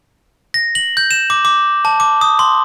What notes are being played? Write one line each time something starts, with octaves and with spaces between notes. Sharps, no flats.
A#6
F#7
G6
E7
D6
D6
A5
D6
D#6
C6